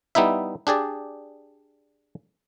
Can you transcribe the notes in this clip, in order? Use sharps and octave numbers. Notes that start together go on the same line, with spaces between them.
G3 B3 D#4 E4 E5
D4 G4 G#4 D5